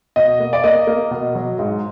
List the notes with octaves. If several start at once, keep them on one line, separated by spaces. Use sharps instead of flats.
B2 D#5
A#3
D5
A#3 D#5
A#3
B2
F#3
G#2